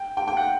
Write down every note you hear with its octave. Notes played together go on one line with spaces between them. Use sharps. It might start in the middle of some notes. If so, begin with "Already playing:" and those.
Already playing: G5
G5
G5
F#5